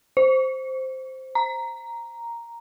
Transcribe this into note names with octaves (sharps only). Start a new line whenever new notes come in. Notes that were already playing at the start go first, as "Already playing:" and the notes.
C5
A#5